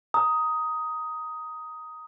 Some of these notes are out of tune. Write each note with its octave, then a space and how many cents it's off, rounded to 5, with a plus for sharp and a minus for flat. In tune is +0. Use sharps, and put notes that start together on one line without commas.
A#5 +0 D#6 +10